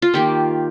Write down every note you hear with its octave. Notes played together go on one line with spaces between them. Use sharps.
F4
D#3 A#3 G4